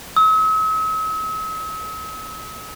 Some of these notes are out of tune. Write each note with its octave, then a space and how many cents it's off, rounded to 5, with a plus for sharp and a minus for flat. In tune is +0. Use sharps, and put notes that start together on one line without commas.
E6 -45